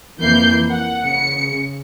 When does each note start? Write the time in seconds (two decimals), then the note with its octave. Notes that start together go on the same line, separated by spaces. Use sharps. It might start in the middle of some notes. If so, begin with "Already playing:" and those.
0.20 F2 E3 A#3 G6 C7
0.70 F#5
1.03 C#3 C#7